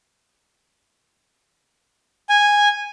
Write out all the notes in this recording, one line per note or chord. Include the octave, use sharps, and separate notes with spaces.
G#5